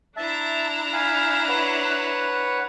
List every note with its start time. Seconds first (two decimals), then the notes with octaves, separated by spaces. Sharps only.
0.17 D4 E4 E5 A5 A#5
0.93 F5 G#5 B5
1.49 B4 C#5 F#5